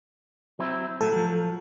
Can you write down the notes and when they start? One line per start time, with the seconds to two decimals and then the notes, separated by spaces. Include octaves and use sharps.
0.59 F#3 C4 E4
1.01 A2 F#3 A4
1.12 F3 F#3